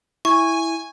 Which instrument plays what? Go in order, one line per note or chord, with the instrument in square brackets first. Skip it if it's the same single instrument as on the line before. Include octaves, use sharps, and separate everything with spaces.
[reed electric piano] E4 [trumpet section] G#5 [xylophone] C#6